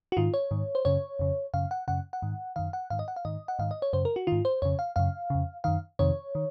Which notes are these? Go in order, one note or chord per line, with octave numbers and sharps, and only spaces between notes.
F#4
G#2 D#3 F4
C#5
G#2 D#3
C5
F#2 C#3 C#5
F2 C#3
F#2 C#3 F5
F#5
F#2 C#3 F#5
F#5
G#2 D#3
F#2 D#3 F5
F#5
G#2 D#3 F5
D#5
F#5
F5
G#2 D#3 D#5
F#5
G#2 D#3 F5
D#5
C#5
F#2 C#3 C5
A#4
F#4
G#2 D#3 F4
C5
F2 C#3 C#5
F5
F#2 C#3 F5
F2 C#3
F#2 D#3 F5
F2 C3 D#3 C#5
D#3